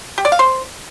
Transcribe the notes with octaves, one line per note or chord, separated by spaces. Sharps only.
G4
D5
F5
C5